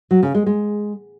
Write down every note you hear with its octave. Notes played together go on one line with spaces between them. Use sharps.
F#3
C#3
G#3
G#3